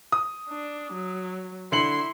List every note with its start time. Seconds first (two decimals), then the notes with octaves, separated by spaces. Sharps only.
0.12 D#6
0.49 D4
0.93 F#3
1.72 D3 E4 C6 C#7 F#7